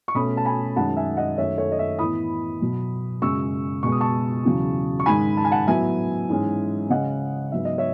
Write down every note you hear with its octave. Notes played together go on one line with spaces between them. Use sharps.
C#6
B2 A3 C#4 B5 D#6
A5
G#5 B5
F#2 D#3 G#3 C#4 F#5 A5
E5 G#5
D#5 F#5
F#2 D#3 A3 C#4 C#5 E5
A4 C#5
D#5
C#5 E5
A2 E3 B3 B5 D#6
B2 F#3 B3
F#2 C#3 G#3 C#6 E6
B2 G#3 B3 C#6
D#6
A5 C#6
E2 C#3 F#3
C#6
G#2 D#3 G#3 G#5 B5
A5
G#5
F#5 A5
A2 F#3 B3 E5 G#5
G#2 E3 G#3 C#4
C#3 G#3 C#4 D#5 F#5
G#2 F#3 B3 E5
D#5
C#5 E5